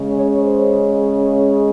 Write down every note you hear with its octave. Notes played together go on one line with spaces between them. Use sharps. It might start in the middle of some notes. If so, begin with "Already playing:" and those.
Already playing: C#3 G#3 C#4
C#5
C5